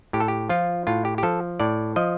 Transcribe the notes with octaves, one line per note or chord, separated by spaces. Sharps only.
A2 G4
A4
G4
F3 F4
A2 F4
G4
G4
F3 A4
A2 D5
F3 D#5